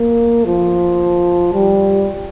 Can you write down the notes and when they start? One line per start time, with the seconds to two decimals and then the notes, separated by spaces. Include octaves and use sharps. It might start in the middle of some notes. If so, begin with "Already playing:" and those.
Already playing: A#3
0.45 F3
1.53 G3